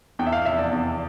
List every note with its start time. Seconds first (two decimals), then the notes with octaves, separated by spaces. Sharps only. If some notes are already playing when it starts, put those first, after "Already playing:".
0.19 E2 G5
0.26 E5
0.32 F5
0.45 F1 E5
0.59 D5
0.72 E2